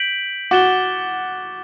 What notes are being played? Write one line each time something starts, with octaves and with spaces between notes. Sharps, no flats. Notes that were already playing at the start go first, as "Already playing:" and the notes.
Already playing: G6 B6 D7 F#7
F#4 D6 A6 E7 G7